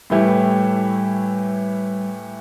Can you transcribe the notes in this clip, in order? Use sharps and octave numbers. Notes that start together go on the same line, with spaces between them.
A2 E3 G3 A3 E4 G4